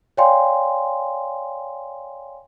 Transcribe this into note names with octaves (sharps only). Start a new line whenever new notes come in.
C#5 D5 F5 G5 G#5 C6